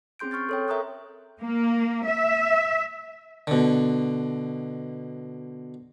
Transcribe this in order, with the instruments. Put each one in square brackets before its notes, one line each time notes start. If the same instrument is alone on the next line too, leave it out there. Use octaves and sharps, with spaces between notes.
[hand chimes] C4 C#4 G#4 C6 G6 D7
C6 C#6 F6 G6 A6
A4 C#5 G5
A#4 E5 A#5 C#6 D#6 F#6
[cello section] A#3
E5
[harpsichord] B2 D3